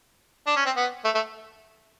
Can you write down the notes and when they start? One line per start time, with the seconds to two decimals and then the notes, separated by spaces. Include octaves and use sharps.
0.47 D4
0.56 C#4
0.66 C4
0.76 B3
1.04 A3
1.14 A3